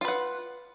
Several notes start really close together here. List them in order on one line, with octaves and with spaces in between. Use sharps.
F4 B4 F#5